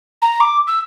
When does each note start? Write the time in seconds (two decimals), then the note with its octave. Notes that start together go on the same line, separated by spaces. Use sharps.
0.22 A#5
0.40 D6
0.67 E6